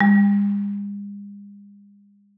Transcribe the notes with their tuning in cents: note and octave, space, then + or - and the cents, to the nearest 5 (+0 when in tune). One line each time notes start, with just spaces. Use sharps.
G#3 -45